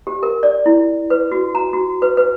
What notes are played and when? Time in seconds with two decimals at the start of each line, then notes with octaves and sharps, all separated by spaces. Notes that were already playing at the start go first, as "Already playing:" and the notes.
0.07 G4
0.23 A#4
0.43 D5
0.66 E4
1.10 B4
1.32 F#4
1.55 A#5
1.73 F#4
2.02 B4
2.17 B4